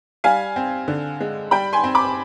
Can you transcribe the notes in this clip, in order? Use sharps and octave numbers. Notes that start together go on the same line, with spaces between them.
G3 F5 G#5
C4
D3
G#3
G3 G5 B5
G#5 C6
C4
B5 D6